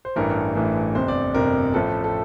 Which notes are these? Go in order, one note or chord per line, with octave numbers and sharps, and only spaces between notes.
C5
A1 G2 E3 A3 A#4
A1 G2 E3 A3
G1 F2 C3 C5
D5
G1 F2 C3 A#4
A1 A2 F3 A3 A4
A4